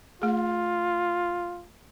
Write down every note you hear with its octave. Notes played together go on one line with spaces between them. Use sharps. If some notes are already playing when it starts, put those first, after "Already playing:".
A3 F4 G#4